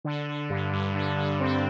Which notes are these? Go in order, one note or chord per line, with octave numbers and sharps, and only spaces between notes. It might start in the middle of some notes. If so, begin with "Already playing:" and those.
D3
D3
G2
G2
D3
D3
C4